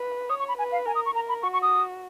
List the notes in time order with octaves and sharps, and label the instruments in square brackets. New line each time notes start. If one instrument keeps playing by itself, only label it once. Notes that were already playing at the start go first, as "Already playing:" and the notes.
Already playing: [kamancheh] B4
[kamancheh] C#5 [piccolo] D#6
[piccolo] C#6
B5
[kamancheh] B4 [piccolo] G#5
[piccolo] F5
[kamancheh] A#4 [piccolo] G#5
[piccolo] D#6
C#6
[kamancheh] A#4 [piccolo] A#5
[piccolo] B5
[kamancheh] F#4 [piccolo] C#6
[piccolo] C#6
D#6